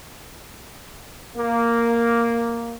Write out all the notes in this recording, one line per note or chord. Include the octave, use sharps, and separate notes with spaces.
A#3